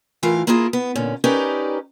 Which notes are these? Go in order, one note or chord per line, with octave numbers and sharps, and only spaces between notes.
A2 E3 F4 A#4 F5
A#3 E4 F4 G#4 A#4
B3
A#2 D3 C#4
C#4 D#4 G4 A#4 B4 D5